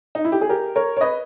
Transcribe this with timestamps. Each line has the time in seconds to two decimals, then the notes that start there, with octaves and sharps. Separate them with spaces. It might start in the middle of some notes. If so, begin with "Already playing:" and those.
0.15 D#4
0.25 E4
0.32 G4
0.41 G#4
0.49 G4 A#4
0.76 A#4 C#5
0.97 C#5
1.01 B4 D#5